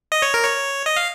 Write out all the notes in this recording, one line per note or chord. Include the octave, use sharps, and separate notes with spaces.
D#5
C#5
A#4
C#5
D#5
F5